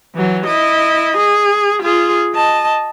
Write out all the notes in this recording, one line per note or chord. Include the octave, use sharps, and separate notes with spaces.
E3 F#3
E4 D#5
G#4
F4 G#4
D#5 A5